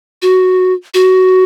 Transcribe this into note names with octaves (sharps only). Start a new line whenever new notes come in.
F#4
F#4